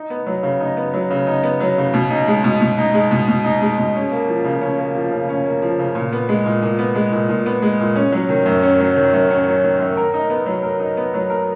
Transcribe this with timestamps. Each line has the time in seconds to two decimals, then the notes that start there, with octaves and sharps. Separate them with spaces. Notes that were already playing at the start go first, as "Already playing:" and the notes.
Already playing: D#4
0.10 B3
0.27 F#3
0.43 C#3
0.61 D#4
0.77 B3
0.94 F#3
1.10 C#3
1.27 D#4
1.43 B3
1.60 F#3
1.78 C#3
1.94 B2
2.10 D#4
2.28 G#3
2.44 B2
2.61 B2
2.78 D#4
2.94 G#3
3.11 B2
3.28 B2
3.45 D#4
3.62 G#3
3.78 B2
3.95 C#4
4.12 A#3
4.28 F3
4.44 C#3
4.61 C#4
4.79 A#3
4.95 F3
5.12 C#3
5.29 C#4
5.46 A#3
5.62 F3
5.79 C#3
5.95 A#2
6.13 B3
6.29 G#3
6.46 A#2
6.62 A#2
6.79 B3
6.96 G#3
7.12 A#2
7.29 A#2
7.46 B3
7.62 G#3
7.80 A#2
7.96 C#4
8.12 F#3
8.29 D#3
8.46 F#2
8.62 C#4
8.80 F#3
8.96 D#3
9.14 F#2
9.30 C#4
9.47 F#3
9.63 D#3
9.80 F#2
9.97 A#4
10.14 D#4
10.30 B3
10.46 F#3
10.63 A#4
10.80 D#4
10.97 B3
11.14 F#3
11.30 A#4